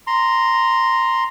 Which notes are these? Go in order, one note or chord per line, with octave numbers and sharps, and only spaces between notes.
A#5 C6